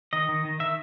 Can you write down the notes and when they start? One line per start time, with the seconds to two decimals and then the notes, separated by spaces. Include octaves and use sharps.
0.13 D#3 D#5
0.29 D#3
0.45 D#3
0.60 D#3 E5